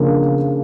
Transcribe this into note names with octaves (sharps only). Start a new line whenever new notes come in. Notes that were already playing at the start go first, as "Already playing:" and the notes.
Already playing: C#3 F3 A#3 D4 A#4